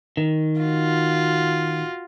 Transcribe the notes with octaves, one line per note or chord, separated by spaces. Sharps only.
D#3
F4 F#4